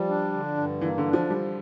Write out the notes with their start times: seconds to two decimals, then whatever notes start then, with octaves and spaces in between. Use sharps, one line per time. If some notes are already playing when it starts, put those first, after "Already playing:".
Already playing: F3 G3
0.08 D4
0.33 D3
0.57 G2
0.81 E3 A#3
0.98 D3
1.06 D4
1.13 F3
1.30 F3 G3